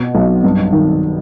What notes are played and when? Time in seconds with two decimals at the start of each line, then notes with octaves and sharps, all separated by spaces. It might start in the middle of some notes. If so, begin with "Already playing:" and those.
Already playing: B2
0.15 B1
0.44 G2
0.72 D#3